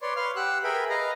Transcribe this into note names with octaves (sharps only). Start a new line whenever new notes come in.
B4 C#5 D5 C6
B4 F5 C6 F6
G4 F#5 E6 F#6
G#4 A#4 B4 E5 G5 B5
B4 D#5 F5 A#5